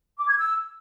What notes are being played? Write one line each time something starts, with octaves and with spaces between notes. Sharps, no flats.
D6
G#6
E6